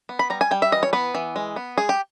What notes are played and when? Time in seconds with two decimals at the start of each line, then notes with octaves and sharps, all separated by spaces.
0.09 B3
0.19 B5
0.30 G3 A#5
0.41 G#5
0.51 G3 G5
0.62 E5
0.72 E3 D#5
0.83 C#5
0.93 B3 B4
1.15 E3
1.36 G#3
1.56 B3
1.78 G#3 G#4
1.89 G4